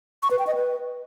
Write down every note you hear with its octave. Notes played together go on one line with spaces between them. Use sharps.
C#6
B4
G5
D#5
B4